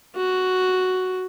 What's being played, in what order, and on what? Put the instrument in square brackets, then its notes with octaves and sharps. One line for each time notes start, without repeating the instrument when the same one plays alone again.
[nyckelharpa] F#4